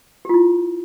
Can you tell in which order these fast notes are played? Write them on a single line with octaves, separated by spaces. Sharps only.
G4 F4 E4